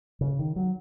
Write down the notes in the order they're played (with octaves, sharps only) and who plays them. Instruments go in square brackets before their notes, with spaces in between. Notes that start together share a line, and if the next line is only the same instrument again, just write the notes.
[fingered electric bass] C#3
D#3
F#3